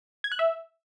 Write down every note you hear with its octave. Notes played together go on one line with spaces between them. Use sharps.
G#6
F#6
E5